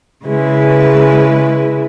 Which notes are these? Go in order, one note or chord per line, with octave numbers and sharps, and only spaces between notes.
C#3 G#3 E4 B4